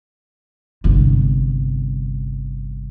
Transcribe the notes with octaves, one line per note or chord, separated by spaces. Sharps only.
G1 C2